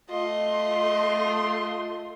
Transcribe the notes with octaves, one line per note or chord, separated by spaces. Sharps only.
A3 F4 D#5 C6